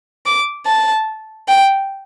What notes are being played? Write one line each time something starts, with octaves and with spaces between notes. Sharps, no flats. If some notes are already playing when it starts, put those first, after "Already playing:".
D6
A5
G5